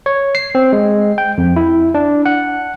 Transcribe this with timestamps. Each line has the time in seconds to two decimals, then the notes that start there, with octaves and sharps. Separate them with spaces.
0.06 C#5
0.35 C7
0.55 C4
0.73 G#3
1.18 G5
1.38 F2
1.56 E4
1.95 D4
2.26 F#5